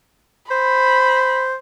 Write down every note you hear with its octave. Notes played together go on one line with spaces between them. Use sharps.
C5 B5